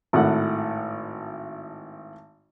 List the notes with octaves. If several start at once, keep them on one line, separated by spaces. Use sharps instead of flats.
G#1 A2 F#5